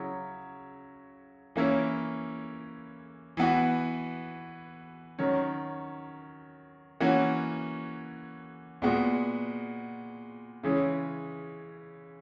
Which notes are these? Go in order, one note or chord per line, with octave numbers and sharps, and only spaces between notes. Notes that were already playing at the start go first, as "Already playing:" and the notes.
Already playing: C#3 F#3 C#4 E4
E3 A#3 C#4 E4
E3 B3 F#4
D#3 F#3 C#4
E3 A#3 C#4 F#4
A#2 G#3 B3 F#4
C#3 E3 G#3 C#4